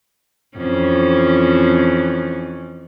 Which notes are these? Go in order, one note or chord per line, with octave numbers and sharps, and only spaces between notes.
F2 E3 C#4